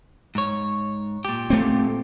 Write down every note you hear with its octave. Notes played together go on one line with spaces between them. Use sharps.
G#2 C#5
A#2 G4
A3 C4